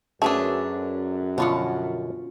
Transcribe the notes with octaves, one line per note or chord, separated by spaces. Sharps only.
F#2 A3 C#4 D4 G#4 B4 E5
B2 D3 F3 C#4 F4 F#5